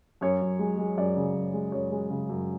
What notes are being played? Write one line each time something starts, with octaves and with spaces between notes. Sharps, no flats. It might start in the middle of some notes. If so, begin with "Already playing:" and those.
F#2 C#5
F#2
G#3
G#3
F#2 D5
C#3
F#2
G#3
F#2 C#5
G#3
C#3
F#2